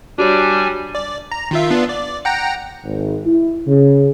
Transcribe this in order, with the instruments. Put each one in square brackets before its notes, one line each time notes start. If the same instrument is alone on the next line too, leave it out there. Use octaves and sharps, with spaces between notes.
[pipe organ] G3 G#5 [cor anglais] D4 [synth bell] F#4 G4 C#5
[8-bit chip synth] D5
A#5
D#3 F4 E5
B3 D4 F4
D5
F#5 G5 A#5
[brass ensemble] G#1
E4
C#3